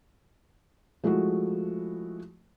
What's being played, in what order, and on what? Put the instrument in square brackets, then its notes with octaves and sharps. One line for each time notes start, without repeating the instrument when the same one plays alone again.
[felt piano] F3 G#3 A3 E4 F#4